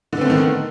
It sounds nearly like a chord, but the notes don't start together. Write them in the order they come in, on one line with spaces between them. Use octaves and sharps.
D3 B3 C4 A3 D#3